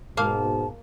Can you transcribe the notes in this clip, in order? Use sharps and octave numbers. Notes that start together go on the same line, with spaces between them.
G#2 B2 A#3 F5 A5